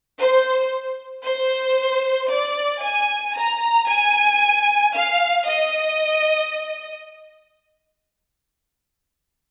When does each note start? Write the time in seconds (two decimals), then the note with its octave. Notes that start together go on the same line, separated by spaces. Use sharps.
0.19 C5
1.25 C5
2.30 D5
2.83 G#5
3.36 A#5
3.88 G#5
4.94 F5
5.47 D#5